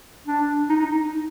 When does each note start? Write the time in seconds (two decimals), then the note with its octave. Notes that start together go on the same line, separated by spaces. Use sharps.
0.27 D4
0.69 D#4
0.80 D#4